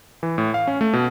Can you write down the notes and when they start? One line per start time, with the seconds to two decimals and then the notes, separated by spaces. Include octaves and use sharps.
0.23 E3
0.38 A2
0.54 F5
0.67 C#4
0.81 A3
0.93 B2